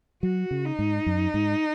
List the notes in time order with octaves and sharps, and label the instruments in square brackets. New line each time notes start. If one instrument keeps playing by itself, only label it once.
[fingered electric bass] F#3 [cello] F#4
[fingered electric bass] C#3
[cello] D#4
[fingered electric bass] G#2
F#2
G#2